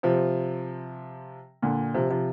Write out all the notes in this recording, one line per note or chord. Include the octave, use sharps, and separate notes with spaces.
C3 F3
A#2 D3
C3 F3
C3 F3